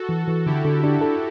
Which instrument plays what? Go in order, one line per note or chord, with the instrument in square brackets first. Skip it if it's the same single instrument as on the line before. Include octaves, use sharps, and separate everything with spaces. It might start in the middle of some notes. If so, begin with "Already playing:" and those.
Already playing: [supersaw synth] F#4 A4
[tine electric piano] E3
E3
[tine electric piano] D3 [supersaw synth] E4 G4
[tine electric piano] D3
D4
A4